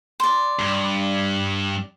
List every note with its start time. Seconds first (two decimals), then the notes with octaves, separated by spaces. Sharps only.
0.20 D5 C6
0.59 G2 G3